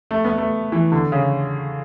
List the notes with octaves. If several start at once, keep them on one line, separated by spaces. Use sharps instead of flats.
A3
B3
A3
E3
D3
C#3